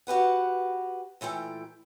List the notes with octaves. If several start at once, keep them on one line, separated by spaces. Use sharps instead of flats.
F#4 G4 B4 F#5
A#2 E3 A3 G5